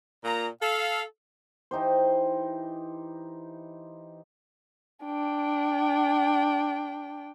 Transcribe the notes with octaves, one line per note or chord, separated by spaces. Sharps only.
A#2 A#5
A4 F5
E3 D#4 G4 C5
D4 G5